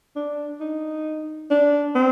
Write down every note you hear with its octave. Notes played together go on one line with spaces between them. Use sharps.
D4
D#4
D4
C4